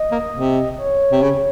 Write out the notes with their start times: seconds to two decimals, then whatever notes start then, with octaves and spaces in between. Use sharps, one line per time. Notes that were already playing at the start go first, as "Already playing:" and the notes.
Already playing: D#5
0.12 A#3
0.34 C3
0.78 C#5
1.11 C3
1.22 C#3